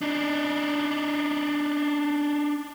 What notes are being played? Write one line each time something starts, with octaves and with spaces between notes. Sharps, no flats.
D4 D#4